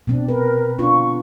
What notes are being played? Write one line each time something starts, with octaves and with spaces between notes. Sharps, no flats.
B2 C4 D4
A#4 B4
B3 D4 F4 C#6